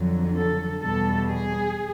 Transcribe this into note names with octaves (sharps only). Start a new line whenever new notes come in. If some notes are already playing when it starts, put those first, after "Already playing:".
Already playing: F2 D3 F#3
A4
E2 B2 G3 A4
G#4